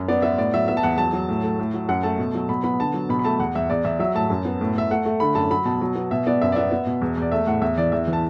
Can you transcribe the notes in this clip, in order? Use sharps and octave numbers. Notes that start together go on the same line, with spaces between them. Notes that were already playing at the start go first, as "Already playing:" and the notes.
Already playing: F#2
B3 D5
B3 E5
A2 D5
F#3 E5
B3 E5
A5
E2 F#5
F#3 A5
F#3
A2
A3
A2
F#3
F#2 F#5
A3 A5
B2
F#3
B2 B5
B3 B5
D3 A5
F#3
B2 B5
B5
A3 A5
E2 F#5
E2 E5
E2 D5
E2 E5
F#3 E5
A2 A5
F#2
B3
A2
A2 E5
A3 F#5
A3
D3 B5
F#2 A5
F#3 B5
B2 A5
F#3
B3
B2 E5
B3 D5
F#2 E5
D5
B3 E5
B3
B2
E2
E2 D5
A3 E5
A2 F#5
E2 E5
E3 D5
E2 E5
E3
A5